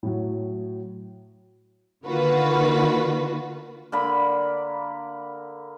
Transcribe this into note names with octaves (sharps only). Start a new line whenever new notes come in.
A2 F#3
D3 D#3 A#3 F4 F#4 B4
D3 A#3 B5